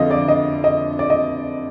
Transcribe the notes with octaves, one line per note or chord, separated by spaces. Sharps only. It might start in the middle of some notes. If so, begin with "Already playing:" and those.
Already playing: F2 D3 F3 D#5 F5
D5
D#5
D#5
D5
D#5